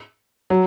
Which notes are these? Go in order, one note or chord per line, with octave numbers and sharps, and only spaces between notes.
F#3